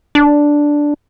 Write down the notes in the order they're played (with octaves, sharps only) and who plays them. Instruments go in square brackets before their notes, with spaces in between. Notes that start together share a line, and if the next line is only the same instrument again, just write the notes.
[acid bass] D4